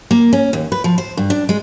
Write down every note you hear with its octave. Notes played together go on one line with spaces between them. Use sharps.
A#3
C#4
D#2
B4
F3
C5
G2
D4
G#3